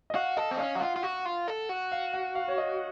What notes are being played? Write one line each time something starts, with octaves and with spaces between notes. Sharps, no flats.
D#5
F#4 F5
A4 D#5
C4
C#4 F5
F#4
F4 F#5
F4
F#4
F4
A4
F#4
F5
F#5
F5
C#5
D#5